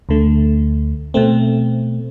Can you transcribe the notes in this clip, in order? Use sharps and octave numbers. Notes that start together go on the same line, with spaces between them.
D2 D3 A3
B2 A3 C4